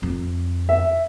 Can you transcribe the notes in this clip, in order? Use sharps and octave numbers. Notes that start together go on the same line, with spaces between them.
F2 C4
E5